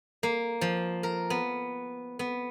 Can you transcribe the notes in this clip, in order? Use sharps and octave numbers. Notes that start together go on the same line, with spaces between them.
A#3
F3
A#4
B3
B3